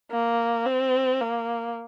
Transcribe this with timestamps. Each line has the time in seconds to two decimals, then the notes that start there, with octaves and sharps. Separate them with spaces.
0.11 A#3
0.66 C4
1.21 A#3